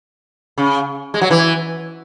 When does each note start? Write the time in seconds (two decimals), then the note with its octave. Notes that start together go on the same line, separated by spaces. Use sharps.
0.58 C#3
1.14 G#3
1.21 F#3
1.31 E3